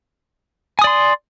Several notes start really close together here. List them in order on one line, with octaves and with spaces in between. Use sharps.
G#5 D#6 D5 C6